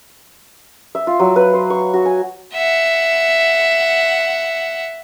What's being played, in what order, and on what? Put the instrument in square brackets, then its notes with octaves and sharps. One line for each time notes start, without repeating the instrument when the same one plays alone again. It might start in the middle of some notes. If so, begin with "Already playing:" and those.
[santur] E5
F4
F#3
B4
C5
C#6
F#4
G#5
[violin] E5 F#5